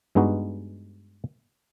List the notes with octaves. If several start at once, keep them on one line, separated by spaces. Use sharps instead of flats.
G2 G#3 B3 D#4 F#4